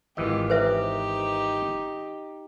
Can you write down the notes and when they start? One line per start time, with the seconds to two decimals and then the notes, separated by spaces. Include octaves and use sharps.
0.17 G#1 E3 F4 G4 D#5
0.50 D#4 G4 B4 C5 E5